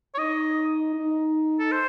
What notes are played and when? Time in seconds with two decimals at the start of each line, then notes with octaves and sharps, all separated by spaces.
0.14 C#5
0.18 D#4 D#5
0.94 D#4
1.59 A4
1.71 C5